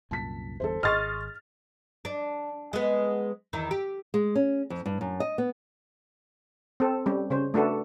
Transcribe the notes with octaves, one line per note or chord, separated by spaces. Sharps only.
C2 F#2 A#2 A5 B6
G1 E2 G2 A4 C5
G#1 G#4 D#5 C6 C#6 F6 A6
D4
G#3 B3
E2 D#3 E4
G4
G#3
C#4
F2
G2
F#2
D#5
B3
C4 A4
G3 C#4 G4
C#3 C#4 C5
A3 D4 F#4 A4 B4